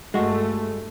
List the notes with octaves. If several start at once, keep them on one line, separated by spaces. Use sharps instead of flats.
G2 G#3 A3 F#4